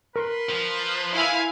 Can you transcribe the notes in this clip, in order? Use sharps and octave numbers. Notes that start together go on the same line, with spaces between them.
A#4 B4 C6
F3
E4 F5 G#5